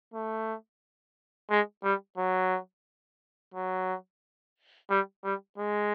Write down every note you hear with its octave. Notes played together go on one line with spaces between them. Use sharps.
A3
G#3
G3
F#3
F#3
G3
G3
G#3